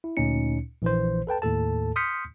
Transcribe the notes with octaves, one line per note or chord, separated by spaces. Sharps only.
E4
D2 A#2 C#4 D#4 C#7
A#1 E3 C5
A4 B4 G5 A5
D#2 A2 A4 A5
C6 D#6 F6 G6 B6 C#7